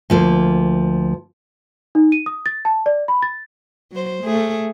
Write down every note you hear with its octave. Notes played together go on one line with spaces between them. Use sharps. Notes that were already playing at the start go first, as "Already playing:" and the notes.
D2 F3 A#3
D#4
D#7
D#6
A6
A5
D5
B5
A6
F#3 C5
A3 G#4